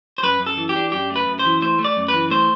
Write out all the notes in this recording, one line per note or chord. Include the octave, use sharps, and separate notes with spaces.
C5
F#2 B4
F#2
A4
E3
G4
D4
F#2 G4
A3
B4
F#2
C5
E3
A3 C5
A3
D5
F#2
B4
E3
A3 C5